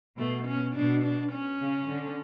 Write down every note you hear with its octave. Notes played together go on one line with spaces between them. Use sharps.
B2 A3
C#4
B2 D4
D4
C#4
C#3
D3